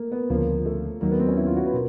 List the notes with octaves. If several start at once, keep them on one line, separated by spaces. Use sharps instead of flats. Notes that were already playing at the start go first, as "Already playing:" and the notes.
Already playing: A3 A#3
B3
D2 C#3 F3 A#3
A3
D#2 D#3 F#3 A#3
B3
C4
C#4
E4
F4
F#4
B4
B2 A#4